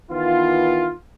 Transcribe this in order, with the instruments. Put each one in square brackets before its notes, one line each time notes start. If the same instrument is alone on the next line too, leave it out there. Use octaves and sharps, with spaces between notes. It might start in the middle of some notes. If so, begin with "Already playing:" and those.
[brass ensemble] D#3 E3 B3 F4